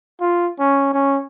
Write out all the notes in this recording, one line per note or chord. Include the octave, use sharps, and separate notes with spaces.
F4
C#4
C#4